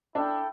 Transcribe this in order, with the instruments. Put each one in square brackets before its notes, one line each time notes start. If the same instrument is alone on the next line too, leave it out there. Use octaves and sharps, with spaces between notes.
[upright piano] D4 [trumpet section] E4 A4 E5 G5